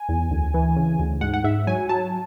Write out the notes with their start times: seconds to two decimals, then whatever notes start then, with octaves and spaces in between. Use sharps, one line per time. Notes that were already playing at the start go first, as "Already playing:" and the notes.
Already playing: G#5
0.09 E2
0.31 D2
0.54 E3
0.77 C#3
0.99 D2
1.21 G#2 F#5
1.34 F#5
1.44 G#2 E5
1.67 F#3 G#5
1.89 F#3 A5